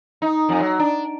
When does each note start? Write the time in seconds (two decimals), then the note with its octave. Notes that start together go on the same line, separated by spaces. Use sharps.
0.22 D#4
0.49 F2
0.60 F#3
0.79 D4